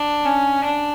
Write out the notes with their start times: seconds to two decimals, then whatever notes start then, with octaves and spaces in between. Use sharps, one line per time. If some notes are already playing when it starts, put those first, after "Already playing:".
Already playing: D4
0.25 C#4
0.65 D4